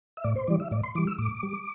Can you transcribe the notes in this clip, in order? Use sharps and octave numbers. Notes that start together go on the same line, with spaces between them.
E5
A2 D5
C5
E3 G3 D5
E5
A2 D5
C6
E3 G3 D6
E6
A2 D6
G3